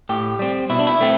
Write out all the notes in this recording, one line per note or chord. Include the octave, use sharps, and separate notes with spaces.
A2 G4
G3 C4
B2 E4
D4
E4
A3 C4